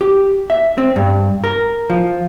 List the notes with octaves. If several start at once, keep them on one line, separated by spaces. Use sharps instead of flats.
G4
E5
C4
G2
A#4
F3